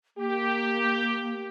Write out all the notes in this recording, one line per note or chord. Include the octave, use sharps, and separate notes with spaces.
A#3 G4